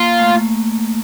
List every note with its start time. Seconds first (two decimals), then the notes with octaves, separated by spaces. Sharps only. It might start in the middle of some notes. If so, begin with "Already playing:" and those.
Already playing: A#3 F4
0.19 A3